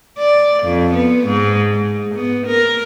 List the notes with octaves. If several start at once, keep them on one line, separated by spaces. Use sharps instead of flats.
D5
F2
B3
G#2
G#2
B3
A#4